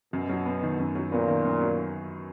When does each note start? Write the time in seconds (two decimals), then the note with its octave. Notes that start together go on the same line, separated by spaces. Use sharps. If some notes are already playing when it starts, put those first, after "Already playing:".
0.13 F#2 B2
0.29 F#3
0.46 B3
0.63 D#3
0.79 F#2
0.95 F#3
1.11 A#2 B3
1.28 D#3
1.45 F#2
1.61 F#3